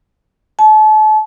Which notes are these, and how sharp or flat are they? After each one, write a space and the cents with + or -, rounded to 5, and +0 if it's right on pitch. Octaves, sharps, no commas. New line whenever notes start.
A5 -35